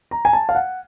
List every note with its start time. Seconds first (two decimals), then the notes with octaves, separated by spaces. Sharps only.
0.11 A#5
0.25 G#5
0.33 A5
0.49 F5
0.55 F#5